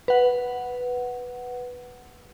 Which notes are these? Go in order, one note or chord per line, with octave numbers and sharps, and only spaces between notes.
B4 F#5